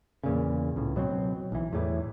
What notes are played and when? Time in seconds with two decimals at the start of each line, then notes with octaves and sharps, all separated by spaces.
0.24 E2 A#2 C#3
0.76 C#2 A2
0.96 B2 F#3 A#3 C4
1.52 B1 E3
1.73 E2 A2 E3